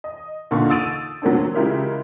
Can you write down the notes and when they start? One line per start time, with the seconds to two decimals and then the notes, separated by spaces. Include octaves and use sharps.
0.04 D#5
0.51 A#2 D3 D#4 F4 C6 C#6
0.69 D#6 E6 A6 D7 D#7 F7
1.22 F#3 A#3 C4 D4
1.55 C#3 G#3 E4 F4 G4 A#4